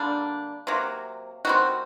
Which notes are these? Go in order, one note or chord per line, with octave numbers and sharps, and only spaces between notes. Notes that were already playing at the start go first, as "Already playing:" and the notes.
Already playing: D3 G3 A#3 D4
C3 F#3 A#3
D#3 G3 C4 F#4